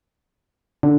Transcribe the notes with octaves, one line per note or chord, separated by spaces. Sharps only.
D3